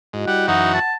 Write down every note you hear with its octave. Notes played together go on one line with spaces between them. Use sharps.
G#2 E4 F#4 D#5
G3 F#5
F#2 E3 D#4 F#4 F#5
A5